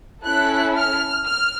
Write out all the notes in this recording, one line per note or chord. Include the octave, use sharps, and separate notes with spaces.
C#4 E4 A4 F#6
F6
F6